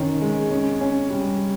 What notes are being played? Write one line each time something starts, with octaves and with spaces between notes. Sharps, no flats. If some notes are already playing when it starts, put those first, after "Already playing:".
Already playing: D#3 C#4
G#3
C#4
C#4
G3